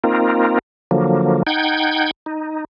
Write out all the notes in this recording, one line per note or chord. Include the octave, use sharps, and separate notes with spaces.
A#3 C4 D#4 F4 A#4
D3 F3 F#3 A#3
D#4 F#5 G5 G6 G#6
D#4